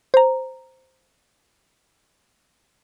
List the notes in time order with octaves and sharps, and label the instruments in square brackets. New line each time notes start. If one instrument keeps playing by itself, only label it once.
[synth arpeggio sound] C5 A#5